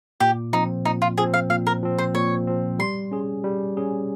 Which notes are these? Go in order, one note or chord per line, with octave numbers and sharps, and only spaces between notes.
A#2 G4
F3 C4 D#4
A#2 D#4
F4
F3 C4 G#4
F5
A#2 F5
A#4
F3 C4
C5
A#2 C#5
F3 C4
G3 C6
C#4 G#4
G3
C#4 G#4